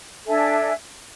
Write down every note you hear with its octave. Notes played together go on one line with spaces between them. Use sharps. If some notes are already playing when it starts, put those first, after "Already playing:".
D4 A4 E5 G#5